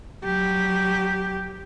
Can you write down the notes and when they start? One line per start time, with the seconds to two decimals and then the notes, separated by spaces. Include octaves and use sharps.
0.24 F#3 G4